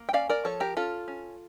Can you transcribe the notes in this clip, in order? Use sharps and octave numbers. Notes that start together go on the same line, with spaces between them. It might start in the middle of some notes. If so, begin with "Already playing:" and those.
Already playing: A#3
G5
C#4 D5 F5
A#4 D5
F3 A4 C#5
G4 A#4
C#4 F4 A4
C#4